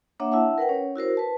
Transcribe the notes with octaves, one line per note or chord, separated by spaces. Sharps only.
A#3 D4 C#5 E5 F#5
E4 E5 F#5 A5
A#4 B4 F#5 G5
C#4 C#5
E4 F#4 A#4 C5
B4 A5